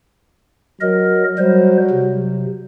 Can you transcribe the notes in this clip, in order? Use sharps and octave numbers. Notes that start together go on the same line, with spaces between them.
F#3 A#4 D#5
F#3 G3 C5
C3